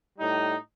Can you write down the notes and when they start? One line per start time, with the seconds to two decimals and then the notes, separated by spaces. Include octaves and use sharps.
0.18 A2 G3 D#4